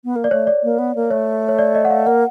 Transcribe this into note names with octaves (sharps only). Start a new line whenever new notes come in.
B3
A#3
D5
A3 C#5
D5
A#3
B3
A#3
A3 C#5
C#5
D5
D#5
F#5
F5
A#3 F#5